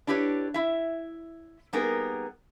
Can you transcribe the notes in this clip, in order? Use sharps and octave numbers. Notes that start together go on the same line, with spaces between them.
D4 E4 G4 B4 C#5
E4 E5
G3 A#3 B3 D#4 G#4 A#4